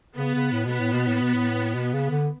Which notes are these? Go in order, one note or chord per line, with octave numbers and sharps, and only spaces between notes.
C#3 B3
C#3
A2
B2 B3
A2
B2
A2
B2
A2
B2
C#3
D3